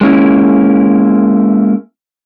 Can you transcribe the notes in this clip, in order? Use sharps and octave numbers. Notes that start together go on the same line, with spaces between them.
G#3 A#3 C#4 E4